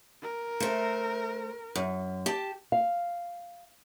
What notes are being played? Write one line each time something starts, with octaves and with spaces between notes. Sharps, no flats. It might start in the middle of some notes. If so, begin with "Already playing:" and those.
A#4
A3 C5
F#2
G4 A5
F5